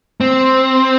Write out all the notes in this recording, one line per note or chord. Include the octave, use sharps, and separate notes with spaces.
C4